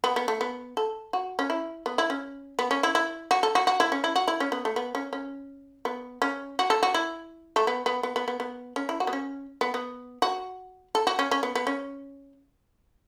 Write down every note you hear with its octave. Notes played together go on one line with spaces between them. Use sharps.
B3
B3
A3
B3
A4
F#4
C#4
E4
B3
E4
C#4
B3
C#4
E4
E4
F#4
A4
F#4
F#4
E4
C#4
E4
F#4
E4
C#4
B3
A3
B3
C#4
C#4
B3
C#4
F#4
A4
F#4
E4
A3
B3
B3
B3
B3
B3
B3
C#4
E4
F#4
B3
C#4
B3
B3
F#4
A4
F#4
C#4
C#4
B3
B3
C#4